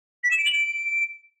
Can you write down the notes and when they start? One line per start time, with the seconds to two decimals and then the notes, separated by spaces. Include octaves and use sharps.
0.24 B6
0.31 E7
0.38 D7
0.46 F#7
0.53 D7